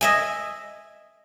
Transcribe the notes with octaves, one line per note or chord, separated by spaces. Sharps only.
D#5 E5 G#5